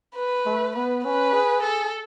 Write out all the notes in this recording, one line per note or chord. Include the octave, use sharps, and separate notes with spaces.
B4
A3
B3 B4
C#4 B4
G#4
A4